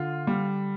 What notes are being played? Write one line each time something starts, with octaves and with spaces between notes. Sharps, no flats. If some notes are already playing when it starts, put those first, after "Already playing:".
Already playing: D3 F4
G3